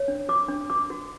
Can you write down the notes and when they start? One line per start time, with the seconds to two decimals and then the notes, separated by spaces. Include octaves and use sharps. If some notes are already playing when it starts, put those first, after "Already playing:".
Already playing: C#5
0.08 D4
0.29 F#4 D6
0.48 D4
0.70 F#4 D6
0.90 F#4